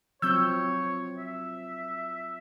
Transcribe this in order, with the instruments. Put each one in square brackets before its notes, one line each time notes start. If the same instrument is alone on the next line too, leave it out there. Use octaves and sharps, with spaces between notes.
[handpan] F3 F#3 C4 [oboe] C#5 [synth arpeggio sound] E6 G6
[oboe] E5